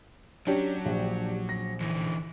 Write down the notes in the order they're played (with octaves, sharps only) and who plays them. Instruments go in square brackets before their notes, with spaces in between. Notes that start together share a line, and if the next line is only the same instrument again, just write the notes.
[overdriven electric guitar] F#3 [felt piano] C#4 [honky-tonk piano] D4 G4
[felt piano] A#1
[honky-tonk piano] A#6
[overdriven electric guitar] D3 E3